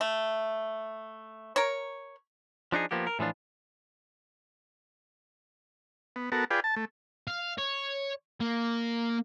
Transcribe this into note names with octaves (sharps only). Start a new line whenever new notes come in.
A3
A#4 C#5
F3 D4 D#4 G#4
F3 A#3 B3 G4
A#4
A2 E3 F3 D4 F4
B3
B3 F#4 A4 A#4
F4 G#4 B4 D5 G5
A5
A3
F5
C#5
A#3